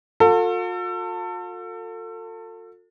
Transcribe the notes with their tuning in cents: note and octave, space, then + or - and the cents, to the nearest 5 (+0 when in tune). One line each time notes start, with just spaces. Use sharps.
F4 +45 A4 +30